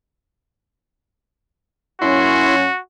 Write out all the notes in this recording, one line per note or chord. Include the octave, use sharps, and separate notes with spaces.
F#2 A#3 C#4 E4 F#4 C6